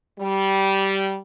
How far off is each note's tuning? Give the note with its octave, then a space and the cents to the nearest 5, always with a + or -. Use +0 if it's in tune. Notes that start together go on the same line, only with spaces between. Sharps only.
G3 -15